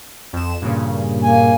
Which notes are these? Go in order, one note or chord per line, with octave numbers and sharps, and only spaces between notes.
F2 E7
G2 A#2 C#3
A#3 G#5